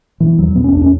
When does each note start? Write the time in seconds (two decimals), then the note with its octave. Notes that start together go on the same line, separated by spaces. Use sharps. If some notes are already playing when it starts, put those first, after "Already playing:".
0.20 B2 E3
0.39 E2 F#3
0.55 B2 B3
0.64 C#4
0.73 E2 D4
0.82 C#4